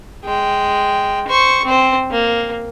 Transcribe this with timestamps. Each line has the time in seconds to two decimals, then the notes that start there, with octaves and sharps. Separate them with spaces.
0.25 G#3 G5
1.28 C5 C#6
1.65 C4 C5
2.11 A#3